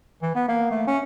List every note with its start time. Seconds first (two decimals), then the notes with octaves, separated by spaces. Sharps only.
0.22 E3
0.35 B3
0.48 A#3
0.71 A3
0.87 C#4